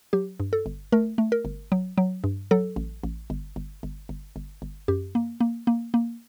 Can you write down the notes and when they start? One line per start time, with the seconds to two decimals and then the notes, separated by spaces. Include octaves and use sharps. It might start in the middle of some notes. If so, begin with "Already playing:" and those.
0.13 F#3 G4
0.40 G2
0.53 A4
0.66 G1
0.92 A3 A#4
1.18 A3
1.32 A#4
1.45 G1
1.72 F#3
1.98 F#3
2.24 G2
2.51 F#3 A4
2.76 A1
3.04 A1
3.30 G1
3.56 G1
3.83 G1
4.09 G1
4.36 G1
4.62 G1
4.88 F#2 G4
5.15 A#3
5.41 A#3
5.67 A#3
5.94 A#3